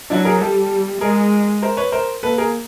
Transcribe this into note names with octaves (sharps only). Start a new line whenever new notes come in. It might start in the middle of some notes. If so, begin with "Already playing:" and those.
F#3 D4 E4
G#4 A#4
G3 G4 A4
G#3 G#4 A#4
A#4 C5
B4 C#5
A#4 C5
A#3 A4 B4
G#4 A#4